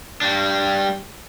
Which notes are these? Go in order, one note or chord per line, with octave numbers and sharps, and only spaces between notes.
G3 D4